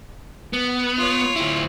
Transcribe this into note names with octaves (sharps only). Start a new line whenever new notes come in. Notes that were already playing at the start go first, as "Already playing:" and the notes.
B3
F4 C#5
D2 E4